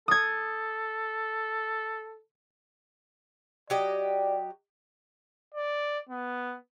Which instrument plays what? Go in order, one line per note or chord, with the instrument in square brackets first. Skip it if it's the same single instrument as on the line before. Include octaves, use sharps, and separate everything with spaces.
[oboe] A4 [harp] D#6 G#6
[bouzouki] F#3 G4 D#5 [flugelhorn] D5
[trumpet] D5
B3